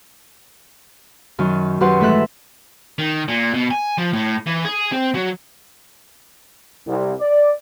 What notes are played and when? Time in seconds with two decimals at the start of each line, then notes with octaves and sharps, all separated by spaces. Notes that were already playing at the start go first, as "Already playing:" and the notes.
1.39 F#2 D#3
1.81 F#2 G4 B4 F#5 C6
2.00 G#2 E3 A3 A4 E5 F#6
2.98 D#3
3.28 A#2
3.54 B2
3.71 G#5
3.98 F3
4.13 A2
4.46 E3
4.65 G#4
4.92 C4
5.15 F#3
6.87 C2
7.20 D5